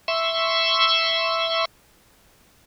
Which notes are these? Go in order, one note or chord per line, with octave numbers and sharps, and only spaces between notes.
E5 C6 C#6 E6